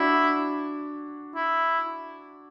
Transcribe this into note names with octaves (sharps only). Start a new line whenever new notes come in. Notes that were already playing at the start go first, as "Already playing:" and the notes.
Already playing: D4 E4 F#4
E4